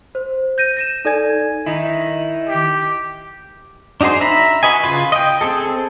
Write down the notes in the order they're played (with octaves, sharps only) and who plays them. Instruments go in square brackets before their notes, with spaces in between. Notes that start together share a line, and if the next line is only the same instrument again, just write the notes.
[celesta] C5
G6 A#6 D#7
A#6 D#7 E7
D#4 A4 D5 G#5 G#6
[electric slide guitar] D#3 D#4 E4
[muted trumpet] G4
[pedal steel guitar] D4 D#4 F#4 G#4 C5
E5 A#5 B5
F#4 B4 D#5 G#5
C#3 F4 B4
D#5 G5
C4 G#4 A4